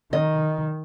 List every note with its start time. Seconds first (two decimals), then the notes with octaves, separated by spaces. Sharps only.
0.13 D#3 D#5